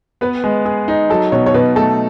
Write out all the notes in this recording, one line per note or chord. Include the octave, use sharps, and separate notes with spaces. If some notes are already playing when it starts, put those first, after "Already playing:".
B3 B4
G#3
G#4
D#4
F#3 A4
B2 C#5
C#5
B2 B4
A3 A4